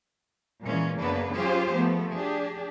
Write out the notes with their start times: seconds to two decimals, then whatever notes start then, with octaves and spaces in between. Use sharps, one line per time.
0.63 A#2 E3 G#3 C#4
0.99 F#2 C#3 A#3 B3 D4 B4
1.36 F#3 C#4 F4 G4 G#4 C5
1.73 F3 A3 B3
2.14 D4 G4 G#4